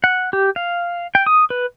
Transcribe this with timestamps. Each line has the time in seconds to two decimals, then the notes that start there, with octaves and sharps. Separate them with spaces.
0.04 F#5
0.33 G4
0.56 F5
1.15 G5
1.26 D#6
1.50 B4